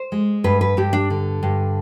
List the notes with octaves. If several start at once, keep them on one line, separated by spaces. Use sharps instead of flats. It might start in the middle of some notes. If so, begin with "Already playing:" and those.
Already playing: C5
G#3
G2 B4
B4
G2 G4
D4
D3
G2